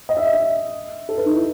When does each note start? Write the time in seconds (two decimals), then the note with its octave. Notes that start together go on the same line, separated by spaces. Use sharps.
0.09 D#5
0.17 E5
0.26 D#5
0.33 E5
1.09 A4
1.17 B4
1.26 D#4
1.33 E4